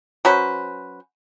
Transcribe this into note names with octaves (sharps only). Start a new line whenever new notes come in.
F#3 C#4 B4 C5